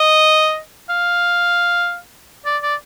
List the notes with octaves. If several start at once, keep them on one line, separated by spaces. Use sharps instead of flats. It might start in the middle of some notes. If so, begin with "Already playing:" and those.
Already playing: D#5
F5
D5
D5